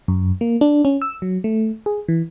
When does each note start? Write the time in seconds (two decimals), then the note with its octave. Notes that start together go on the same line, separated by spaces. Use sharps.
0.08 F#2
0.41 A#3
0.61 D4
0.85 C#4
1.02 E6
1.22 F#3
1.44 A3
1.86 G#4
2.08 E3